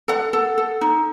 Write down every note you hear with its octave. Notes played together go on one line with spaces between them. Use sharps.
A4 F#5
A4
A4
D#4